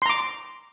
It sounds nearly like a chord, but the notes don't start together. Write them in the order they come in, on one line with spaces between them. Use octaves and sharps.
C6 A#5 D6